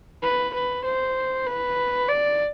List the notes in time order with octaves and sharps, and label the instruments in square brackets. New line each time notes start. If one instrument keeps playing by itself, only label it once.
[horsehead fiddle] B4
B4
C5
B4
D5